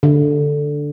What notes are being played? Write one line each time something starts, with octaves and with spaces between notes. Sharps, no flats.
D3